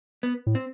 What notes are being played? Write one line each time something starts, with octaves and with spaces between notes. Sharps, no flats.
B3
A2
C4